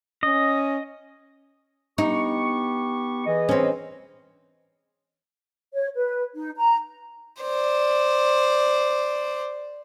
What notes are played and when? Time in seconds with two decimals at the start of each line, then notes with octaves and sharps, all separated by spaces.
0.23 C#4 D#5
1.98 B3 D#4 G4 C#6
3.26 E3 G#4 D#5
3.49 C4 C#4
5.73 C#5
5.96 B4
6.34 D#4
6.56 A#5
7.41 C5 D5